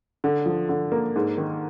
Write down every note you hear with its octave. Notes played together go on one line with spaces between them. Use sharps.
D3
F3
D3
A#3
G#2
D#3